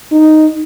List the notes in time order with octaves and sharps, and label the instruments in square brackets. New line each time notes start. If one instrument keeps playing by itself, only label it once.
[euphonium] D#4